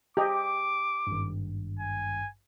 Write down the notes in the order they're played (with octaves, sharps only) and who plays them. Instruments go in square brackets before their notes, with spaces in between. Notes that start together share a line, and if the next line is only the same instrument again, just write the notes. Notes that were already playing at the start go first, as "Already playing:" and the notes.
[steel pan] G4 D#5 [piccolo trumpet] D6
[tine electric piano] G#1 G2
[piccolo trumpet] G#5